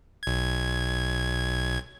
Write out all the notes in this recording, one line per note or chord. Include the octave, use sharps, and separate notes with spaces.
B1 G#6